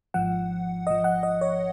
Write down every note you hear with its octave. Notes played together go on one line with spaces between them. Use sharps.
G#1 G#2 F3 F#5
G#1 G#2 F3 D#5
F#5
D#5
C#5